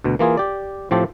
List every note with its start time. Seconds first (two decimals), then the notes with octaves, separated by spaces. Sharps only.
0.04 D2 B2
0.19 E3 A#3 F4 G#4
0.37 G4 D5
0.91 A2 F3 C4 G4 A5